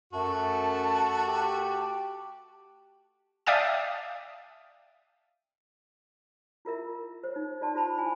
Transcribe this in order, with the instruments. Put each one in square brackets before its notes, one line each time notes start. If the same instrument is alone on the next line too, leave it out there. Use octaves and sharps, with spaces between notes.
[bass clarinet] F#2 [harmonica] A3 F#4 [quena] A5
[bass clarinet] G4
[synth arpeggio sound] D5 E5 F5 G5 A5 D#6
[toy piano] E4 F4 A#4 E5
C5 C#5
D#4
F4 D5 A5 C6
F4 C5 A5 B5
E4 G#5